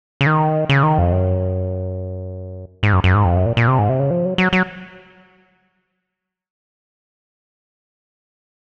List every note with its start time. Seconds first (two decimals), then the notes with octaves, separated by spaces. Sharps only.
0.21 C#3
0.26 D#3
0.69 C#3
0.83 D#3
0.98 F2
1.12 F#2
2.83 G#2
2.93 F#2
3.04 F#2
3.15 G#2
3.25 F2
3.36 F#2
3.46 A#2
3.57 A#2
3.68 C3
3.79 G#2
3.89 C3
4.00 C#3
4.11 F3
4.25 F#3
4.38 F#3
4.53 F#3